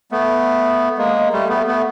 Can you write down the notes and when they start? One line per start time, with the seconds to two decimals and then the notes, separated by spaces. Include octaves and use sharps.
0.11 A3 B3
0.97 G#3 A#3
1.32 G3 A3
1.49 A3 B3
1.67 A3 B3